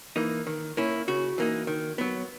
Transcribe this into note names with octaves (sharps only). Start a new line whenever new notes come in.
E3 A#3 D#4
D#3
A#3 C#4 E4
C#3 F#4
E3 A#3 D#4
D#3
F#3 B3